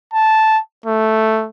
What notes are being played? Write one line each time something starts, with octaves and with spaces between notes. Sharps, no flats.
A5
A3